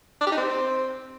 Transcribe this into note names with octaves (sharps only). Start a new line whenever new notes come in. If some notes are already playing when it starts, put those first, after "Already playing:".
D4
G4
D#4
C4